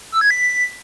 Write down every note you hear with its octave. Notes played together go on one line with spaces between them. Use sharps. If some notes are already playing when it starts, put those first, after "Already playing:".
E6
G#6
B6